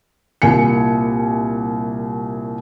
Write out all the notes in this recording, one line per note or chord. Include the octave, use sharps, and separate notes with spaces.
C2 A#2 G#5 C#7